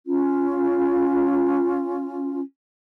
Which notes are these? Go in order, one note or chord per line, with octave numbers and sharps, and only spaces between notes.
C#4 F4